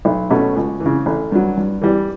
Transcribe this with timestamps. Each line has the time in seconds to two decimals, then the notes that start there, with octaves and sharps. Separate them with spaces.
0.05 B1
0.30 B2 A3 C#4
0.56 C#2
0.80 E3
0.86 C#3
1.06 A1
1.32 G2 F#3
1.57 G2
1.82 E3 G3